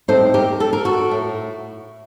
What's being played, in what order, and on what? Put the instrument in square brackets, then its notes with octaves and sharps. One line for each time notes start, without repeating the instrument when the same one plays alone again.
[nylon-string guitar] A2 G3 C4 D#4 A4 C5
G4 A#4
A4
A#4
F#4 A4
A2